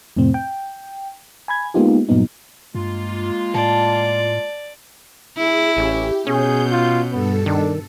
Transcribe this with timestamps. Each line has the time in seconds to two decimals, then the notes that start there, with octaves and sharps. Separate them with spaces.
0.16 F2 A2 C3 C4
0.34 G5
1.48 G#5 B5 G#6
1.74 G#3 A#3 B3 D#4 F4 G4
2.09 G2 A#2 F#3 B3 D#4
2.75 G2 G#3 A#3 F4
3.54 A2 D5 A5
5.38 E4 G#4
5.77 A1 C#4 G4
6.27 B2 C#4 G#4 G6
6.71 F4
7.12 G2 B3 A4
7.46 D#3 D4